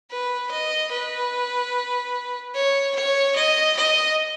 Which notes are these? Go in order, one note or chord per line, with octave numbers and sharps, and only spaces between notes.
B4
D#5
B4
C#5
C#5
D#5
D#5